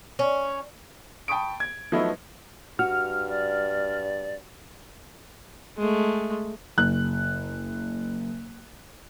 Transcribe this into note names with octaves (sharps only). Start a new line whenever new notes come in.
C#4
G5 A5 B5 C#6 D#6 D7
G#6
F3 F#3 A3 B3 D#4 E4
G2 F#4 F6
D5
G#3 A3
F#1 F#6